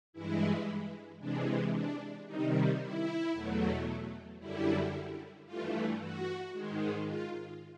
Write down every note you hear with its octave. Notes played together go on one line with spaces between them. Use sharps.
G2 E3 G#3 E4
C3 E3 G#3 D4
D4
C3 D#3 G3 D#4
E4
E2 B2 F#3 A3
F#2 D3 G3 E4
G2 E3 A3 F4
F#4
G#2 D#3 G#3
F4